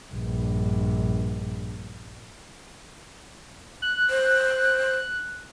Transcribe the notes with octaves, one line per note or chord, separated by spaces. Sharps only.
A#1 G2
F#6
C5